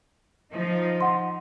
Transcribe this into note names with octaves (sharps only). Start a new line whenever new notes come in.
F3 D#4
F#5 C6